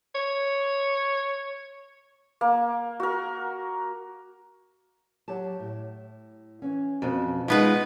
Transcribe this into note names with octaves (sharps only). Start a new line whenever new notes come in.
C#5
A#3
F#4 A#4
F#3 G4 A5
A2
E3 C#4
F2 B2
B2 G#3 B3 D#4 F4 B4